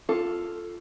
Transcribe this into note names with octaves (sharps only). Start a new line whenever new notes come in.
F4 A4